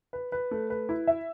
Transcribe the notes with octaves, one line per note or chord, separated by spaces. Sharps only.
B4
B4
A3
B4
E4
E5